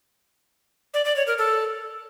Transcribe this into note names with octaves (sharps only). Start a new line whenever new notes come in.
D5
D5
C#5
A#4
A4